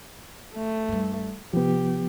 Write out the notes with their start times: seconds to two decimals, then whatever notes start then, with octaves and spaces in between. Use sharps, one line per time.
0.55 A3
0.88 G2 G3
1.53 C3 F3 B3 G4